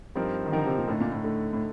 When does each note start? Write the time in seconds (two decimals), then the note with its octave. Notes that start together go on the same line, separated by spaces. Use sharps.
0.15 G2 F3 C4 D#4 A#4
0.46 D#3
0.52 D3 F3 C4 D#4 A#4
0.67 C3
0.78 A#2
0.88 A2 D3 A3 D#4
1.00 A#2
1.12 A2
1.24 D3 A3 D#4
1.53 A2